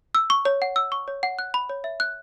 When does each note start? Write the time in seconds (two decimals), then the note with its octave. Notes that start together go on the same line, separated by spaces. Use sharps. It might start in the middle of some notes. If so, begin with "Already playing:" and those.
0.15 E6
0.30 C#6
0.45 C#5
0.62 F#5
0.76 E6
0.92 C#6
1.08 C#5
1.23 F#5
1.39 F#6
1.54 B5
1.69 C#5
1.84 E5
2.00 F#6